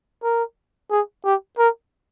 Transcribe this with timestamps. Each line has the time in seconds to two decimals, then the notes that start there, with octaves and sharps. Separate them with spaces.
0.23 A#4
0.91 G#4
1.24 G4
1.58 A#4